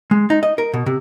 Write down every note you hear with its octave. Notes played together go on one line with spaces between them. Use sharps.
G#3
D#4
D#5
A#4
B2
C3